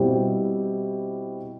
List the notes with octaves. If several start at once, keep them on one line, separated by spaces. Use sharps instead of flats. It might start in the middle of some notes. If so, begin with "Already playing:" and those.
Already playing: B2 G3 C4 E4 G4